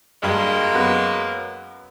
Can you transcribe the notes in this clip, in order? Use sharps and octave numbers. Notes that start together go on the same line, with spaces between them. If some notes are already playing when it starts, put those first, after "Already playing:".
G2 F#3 G#3 A#3
F#2 B3 B4